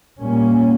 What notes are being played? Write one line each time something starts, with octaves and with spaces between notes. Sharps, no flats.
A#2 G3 A#3 C#4